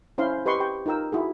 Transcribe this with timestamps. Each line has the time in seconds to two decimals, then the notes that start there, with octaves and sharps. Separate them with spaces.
0.18 C#4 E4 C5 F5 C6
0.46 G4 B4 D#5 C6 C#6
0.60 G4 G5 C#6
0.86 D#4 F4 A#4 G5 E6
1.12 E4 F#4 G#4